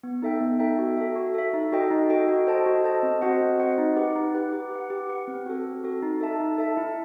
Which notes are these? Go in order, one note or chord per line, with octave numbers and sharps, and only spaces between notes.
B3
D#4 A4 E5 G5
B3
D#4 A4 E5 G5
F#4
A4 E5
F#4
A4 E5
D#4
F#4 A4 D#5 G5
D#4
F#4 A4 D#5 G5
F#4
A4 C5 D#5 A5
F#4
A4 C5 D#5 A5
C4
F#4 C5 D#5 F#5
C4
F#4 C5 D#5 F#5
D#4
G4 B4 F#5
D#4
G4 B4 F#5
G4
B4 F#5
G4
B4 F#5
C4
F#4 A4
C4
F#4 A4
D#4
A4 E5 A5
D#4
A4 E5 A5
E4